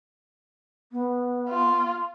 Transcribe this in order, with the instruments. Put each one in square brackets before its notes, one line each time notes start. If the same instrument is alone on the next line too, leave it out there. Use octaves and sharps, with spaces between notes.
[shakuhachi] B3
[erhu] F4